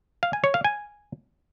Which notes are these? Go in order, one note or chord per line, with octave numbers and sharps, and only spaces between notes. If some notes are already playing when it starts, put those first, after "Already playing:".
F5
G#5
C#5
F5
G#5